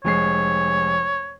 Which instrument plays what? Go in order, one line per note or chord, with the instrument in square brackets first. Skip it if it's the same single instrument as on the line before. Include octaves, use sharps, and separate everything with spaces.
[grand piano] F1 G#3 C7 [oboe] C#5